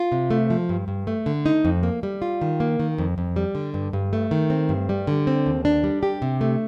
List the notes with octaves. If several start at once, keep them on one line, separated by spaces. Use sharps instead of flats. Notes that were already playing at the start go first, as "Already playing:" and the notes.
Already playing: F4
C3
A3
F3
G2
G2
A3
D3
D#4
F2
A#3
G3
F4
D#3
A#3
D#3
F2
F2
G3
D3
G2
G2
A3
D#3
C4
G2
G3
D3
C4
D#2
D4
G3
G4
C3
A3